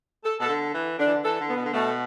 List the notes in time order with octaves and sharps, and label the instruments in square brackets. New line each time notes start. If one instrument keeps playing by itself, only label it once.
[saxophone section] A4
[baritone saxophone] B2 [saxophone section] A4
[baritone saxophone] D3
E3
[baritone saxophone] D3 [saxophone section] D4
[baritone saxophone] E3
D3
[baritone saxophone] E3 [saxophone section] A4
[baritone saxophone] D3
[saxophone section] B3
[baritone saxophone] B2
D3
[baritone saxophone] B2 [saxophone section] A3